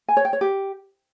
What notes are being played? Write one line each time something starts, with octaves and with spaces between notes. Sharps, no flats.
G#5
C#5
G5
C#5
G4